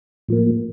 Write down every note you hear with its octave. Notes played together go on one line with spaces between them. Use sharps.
A2 F3 A#3